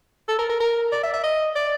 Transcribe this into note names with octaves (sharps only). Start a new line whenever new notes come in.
A4
A#4
A#4
A#4
D5
E5
E5
D#5
D5